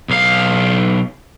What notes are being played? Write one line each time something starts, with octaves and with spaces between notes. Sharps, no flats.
B1 F5